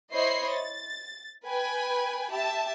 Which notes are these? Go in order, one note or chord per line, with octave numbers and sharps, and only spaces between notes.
E4 C5 C#5 D#5 B5 C7
A6
B4 G5 G#5 B5
G4 E5 A5